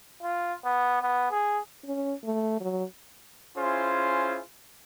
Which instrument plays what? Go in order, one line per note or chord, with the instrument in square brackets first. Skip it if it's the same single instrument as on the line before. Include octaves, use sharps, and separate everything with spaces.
[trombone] F4
B3
B3
G#4
[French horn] C#4
A3
F#3
[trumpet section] C#4 E4 F4 G#4 C5